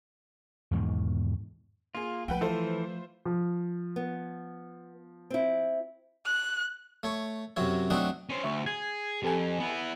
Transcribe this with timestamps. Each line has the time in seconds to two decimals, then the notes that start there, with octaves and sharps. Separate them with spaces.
0.71 E2 G#2 B2 D#3
1.95 A#3 F4 G#4
2.28 F3 A3 B4 F#5 G5
2.41 E3 E4 F4 A4 C5
3.25 F3
3.96 B3
5.30 C4 E4
6.25 F#6
7.03 A3 C#5 C#6
7.56 F#2 C3 F#3 C#5
7.90 F#3 A3 C4 D4 D#4 F#4
8.29 C#4 C5
8.44 D2 E5 C#6
8.66 G#4 G#6
9.23 F2 G4 A4 G#5
9.60 B3 E4